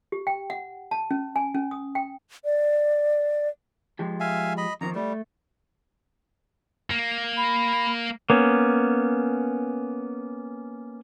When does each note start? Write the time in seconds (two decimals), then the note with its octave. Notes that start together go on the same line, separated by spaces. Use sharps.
0.12 G4
0.27 G5
0.50 F#5
0.91 A5
1.11 C#4
1.36 G#5
1.55 C#4
1.71 D#6
1.95 G5
2.45 D5
3.99 F3 G#3 G4
4.20 E5 F5 G#5
4.57 D#5 B5
4.81 F2 D#3 F3 A#5
4.95 G3 A3
6.90 A#3
7.37 B5
8.30 A#3 B3 C#4